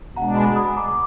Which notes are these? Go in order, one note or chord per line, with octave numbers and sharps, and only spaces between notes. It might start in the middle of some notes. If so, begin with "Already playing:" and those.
B2 G#3 D4 F#5 A#5
G#5 B5
B5 D#6
A#5 D6
D6